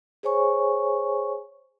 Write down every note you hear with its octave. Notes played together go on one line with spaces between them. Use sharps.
G#4 C5 C#5 G#5 C#6